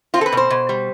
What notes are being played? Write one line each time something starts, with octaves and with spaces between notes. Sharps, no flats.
C4 F4
A4
B4
B2 C5
B2
G3